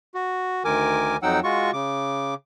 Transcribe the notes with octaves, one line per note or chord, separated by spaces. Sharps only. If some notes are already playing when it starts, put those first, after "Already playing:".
F#4
D2 D#3 A#4 G#5 D6
F2 F#3 D#4 F#5 G5 E6
G#3 F4 F#4 C#6
C#3 D6